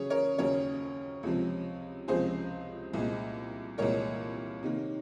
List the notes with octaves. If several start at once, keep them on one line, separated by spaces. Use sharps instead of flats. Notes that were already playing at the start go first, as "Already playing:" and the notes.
Already playing: C#3 F#3 C#4 G#4 C#5
A#4 C#5
D#2 C#3 F#3 C#4 A#4 C#5
C#2 C3 F3 C4
C#2 C3 F3 C4 G#4 C5
C2 A#2 G#3
C2 A#2 G#3 A#4 C#5
C3 D#3 A#3